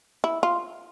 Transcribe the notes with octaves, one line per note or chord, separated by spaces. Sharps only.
E4
F4